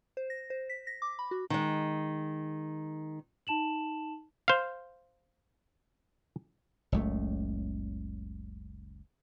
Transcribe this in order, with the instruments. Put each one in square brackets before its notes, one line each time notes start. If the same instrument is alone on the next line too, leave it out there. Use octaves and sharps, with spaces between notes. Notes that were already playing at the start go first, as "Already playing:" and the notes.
[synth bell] C5
A#6
C5
B6
A#6
D6
B5
F#4
[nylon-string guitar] D#3 G#3
[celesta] D#4 A5 E7 F#7
[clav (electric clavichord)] C5 F5
[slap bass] F#1 C#2 A3